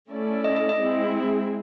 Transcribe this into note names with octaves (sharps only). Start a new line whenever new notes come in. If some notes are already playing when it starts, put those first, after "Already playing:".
A3 C#4 E4 A4 D5
D#5
D#5
D#5
G#3 C4 E4 G#4